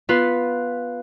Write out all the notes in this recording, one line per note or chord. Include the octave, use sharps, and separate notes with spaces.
B3 F4 B4 F5